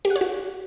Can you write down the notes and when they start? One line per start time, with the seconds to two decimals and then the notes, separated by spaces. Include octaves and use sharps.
0.05 G4
0.10 F#5
0.16 C#5
0.21 F#4